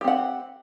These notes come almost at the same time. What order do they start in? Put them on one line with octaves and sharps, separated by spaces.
G4 C4 F#5